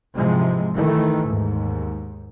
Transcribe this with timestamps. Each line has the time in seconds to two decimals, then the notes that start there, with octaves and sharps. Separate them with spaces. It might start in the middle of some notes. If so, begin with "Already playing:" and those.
0.16 G#2 C3 E3 F3 G#3
0.75 D#3 E3 A3
1.27 D#2 G#2